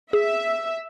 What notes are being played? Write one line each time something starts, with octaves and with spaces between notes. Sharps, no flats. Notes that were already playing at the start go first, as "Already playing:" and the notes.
G#4 E5